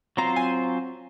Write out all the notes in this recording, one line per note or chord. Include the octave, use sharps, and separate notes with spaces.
F#3 C4 F4 C5 A#5
G#5